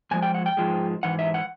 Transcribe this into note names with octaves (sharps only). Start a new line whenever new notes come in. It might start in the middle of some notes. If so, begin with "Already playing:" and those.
G#2 F3 G#3 G#5
G5
F#5
G5
G#2 F3 G#3
G#2 E3 F#5
E5
F#5